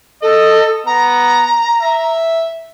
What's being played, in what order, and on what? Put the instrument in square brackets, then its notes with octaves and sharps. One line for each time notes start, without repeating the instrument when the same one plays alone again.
[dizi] A4 [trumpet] D#5
[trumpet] B3 [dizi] A#5
[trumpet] E5